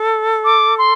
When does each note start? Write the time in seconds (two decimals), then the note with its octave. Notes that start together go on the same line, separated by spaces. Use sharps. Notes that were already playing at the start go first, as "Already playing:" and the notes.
Already playing: A4
0.44 D6
0.78 C6